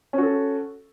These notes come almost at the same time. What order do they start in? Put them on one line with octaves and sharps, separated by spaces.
C#4 F#4 A4